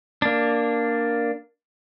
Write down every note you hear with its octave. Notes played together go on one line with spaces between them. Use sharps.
A#3 D4